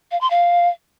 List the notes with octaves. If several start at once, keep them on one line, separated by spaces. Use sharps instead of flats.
F5
C6
F5